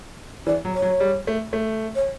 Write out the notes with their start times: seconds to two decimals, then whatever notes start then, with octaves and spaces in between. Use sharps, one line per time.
0.47 E3 D5
0.65 F#3
0.74 C#5
0.82 F#3
1.00 G3
1.27 A3
1.53 A3
1.95 C#5